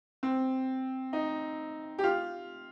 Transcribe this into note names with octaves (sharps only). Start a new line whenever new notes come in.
C4
D#4
G4
F4